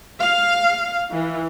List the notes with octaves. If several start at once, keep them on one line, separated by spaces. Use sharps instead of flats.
F5
E3